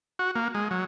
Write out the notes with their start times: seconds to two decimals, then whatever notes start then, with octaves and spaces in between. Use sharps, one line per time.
0.19 F#4
0.36 A#3
0.55 G#3
0.71 F#3